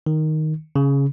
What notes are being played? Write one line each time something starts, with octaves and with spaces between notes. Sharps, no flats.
D#3
C#3